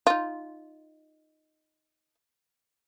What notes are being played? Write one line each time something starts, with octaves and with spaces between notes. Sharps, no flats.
D#4 F4